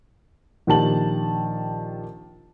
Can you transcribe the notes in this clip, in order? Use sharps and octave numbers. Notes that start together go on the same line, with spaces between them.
A#1 D#3 G4 A5 F#7